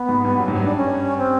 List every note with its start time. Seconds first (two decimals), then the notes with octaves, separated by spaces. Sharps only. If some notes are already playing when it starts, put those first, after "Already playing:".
Already playing: B3
0.08 G#2
0.25 G2
0.39 F#2
0.48 G#2
0.55 G2 C4
0.61 D#4
0.65 D4
0.76 C#4
1.18 C4